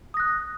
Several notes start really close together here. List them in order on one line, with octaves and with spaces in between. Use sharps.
D#6 A#6 F#6